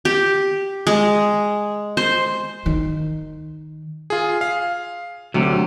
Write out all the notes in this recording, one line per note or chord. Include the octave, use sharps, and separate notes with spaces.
G4
G#3
C5
D#3
F4 G#4
F5
D2 C3 F#3